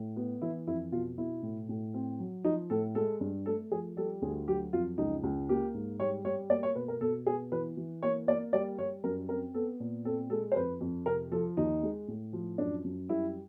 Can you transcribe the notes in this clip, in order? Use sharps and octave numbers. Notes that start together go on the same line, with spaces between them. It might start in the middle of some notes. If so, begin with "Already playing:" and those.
Already playing: A2
B3
E3 E4
F2 E4
B2 F4
B2 E4
A2
A2
C4
F#3
F3 D#4
A2 A4
G#3 A4
G2
A3 A4
F3 G#4
G3 A4
D2 G#4
F#3 G4
F2 F4
C#2 D#4
C#2
A#3 G4
G#2
G3 C#5
G3 C#5
A#3 D5
C#5
B2 B4
A#4
B2 A4
B3 G#4
E3 B4
E3
A#3 C#5
A#3 D5
G3 D5
G3 C#5
F#2 A#4
C4 A#4
B3 A4
A#2
C4 A4
G#3 A4
C5
F2 B4
F2
C3 A#4
F3 A4
D#2 D#4
G#3
A2
F3
F#2 D4
F#2
G3 E4